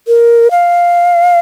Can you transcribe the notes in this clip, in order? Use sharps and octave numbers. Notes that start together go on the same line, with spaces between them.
A#4
F5